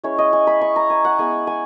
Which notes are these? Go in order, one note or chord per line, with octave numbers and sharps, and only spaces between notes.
G#3 C#4 E4 C#5
D#5
G#5
B5
C#6
A#5
G#5
F#5
G#3 B3 E4 G#5
G#5